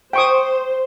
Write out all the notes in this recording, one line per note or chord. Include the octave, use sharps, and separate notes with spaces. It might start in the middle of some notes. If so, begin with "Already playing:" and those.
C5 G5 C#6 D#6